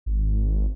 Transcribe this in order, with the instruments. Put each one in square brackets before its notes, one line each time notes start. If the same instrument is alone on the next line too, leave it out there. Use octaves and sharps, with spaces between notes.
[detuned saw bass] G#1